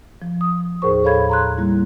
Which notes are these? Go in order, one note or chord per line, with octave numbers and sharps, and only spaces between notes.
F3
D#6
D#2 A2 G#4 A#4 C5 C#6
A4 C#5 F5 B5 G#6
A#5 C6 F#6
G3 A#3 E4